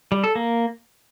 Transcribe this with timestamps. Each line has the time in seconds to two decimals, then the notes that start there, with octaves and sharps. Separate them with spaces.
0.12 G3
0.24 A4
0.35 A#3